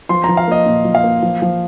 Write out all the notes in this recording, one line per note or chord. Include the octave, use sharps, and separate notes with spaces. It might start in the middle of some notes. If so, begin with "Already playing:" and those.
F3 C6
F3 A#5
F5
A#3 D#5
A#2
F3
F5
A#3
F3
F3